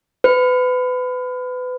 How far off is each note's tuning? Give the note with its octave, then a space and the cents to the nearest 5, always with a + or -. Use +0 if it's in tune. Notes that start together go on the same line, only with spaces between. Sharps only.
B4 +30